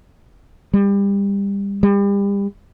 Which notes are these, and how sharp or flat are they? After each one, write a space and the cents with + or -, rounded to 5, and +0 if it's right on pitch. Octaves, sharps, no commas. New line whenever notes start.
G3 +25
G3 +35